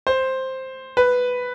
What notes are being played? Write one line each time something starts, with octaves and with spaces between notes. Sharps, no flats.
C5
B4